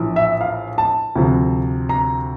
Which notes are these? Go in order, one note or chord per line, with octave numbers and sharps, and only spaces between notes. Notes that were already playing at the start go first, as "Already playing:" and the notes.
Already playing: A#1 A2 E3
E5
F5
A5
D2 C3 F3
A#5